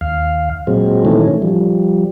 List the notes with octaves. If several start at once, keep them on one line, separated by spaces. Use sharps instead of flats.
D#2 F5
A#2 F#3 G#3 C4
A#2 D#3 E3 A3 C#4
F3 G3